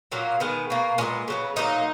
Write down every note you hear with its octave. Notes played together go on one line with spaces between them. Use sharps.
A#2 F#3 A#3
D#3 G#3 B3
B2 A#3
A#2 G#3 B3 C#4
C#3 F#3 B3
A#2 F#3 A#3 D#4